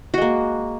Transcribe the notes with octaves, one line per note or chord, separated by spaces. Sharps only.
G#3 A#3 F#4